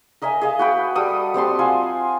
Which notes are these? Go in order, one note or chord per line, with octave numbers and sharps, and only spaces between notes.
A#4 D#5 E5 G#5
G#4 D#5 F5
F#4 B4 G5
G3 F#4 A4 D#6
G3 C4 A5 C6
F4 C5 F#5 G#5